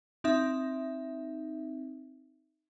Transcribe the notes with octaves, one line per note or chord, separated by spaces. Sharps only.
C4 D#4 E5